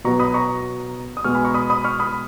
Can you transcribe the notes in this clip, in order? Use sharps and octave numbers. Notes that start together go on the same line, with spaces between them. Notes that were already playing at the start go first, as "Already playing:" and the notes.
B2 F#3 B3 A#5 C#6
B5 D#6
A#5 C#6
D#6
B2 G#3 B3 C#6 F6
G#5 B5
A#5 C#6
B5 D#6
B5 D#6
C#6 F6
B5 D#6